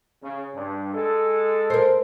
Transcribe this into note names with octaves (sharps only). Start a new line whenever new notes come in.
C#3
G2
G#3 A4
A#4 C5